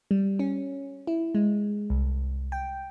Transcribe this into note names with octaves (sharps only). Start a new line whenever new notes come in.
G3
C#4
E4
G#3
C2
G5